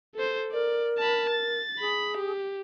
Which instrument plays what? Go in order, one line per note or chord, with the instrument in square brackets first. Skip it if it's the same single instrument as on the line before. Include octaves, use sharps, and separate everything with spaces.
[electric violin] A4 C5
[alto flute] A#4 [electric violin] D5
[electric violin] A5 B5
A6
[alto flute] G#4 [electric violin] B5
[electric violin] G4